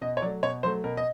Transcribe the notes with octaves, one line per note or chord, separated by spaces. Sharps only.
B2 D#5
C#5
F#3 A3 D5
B2 C#5
F#3 A3 C5
B2 A#4
D#5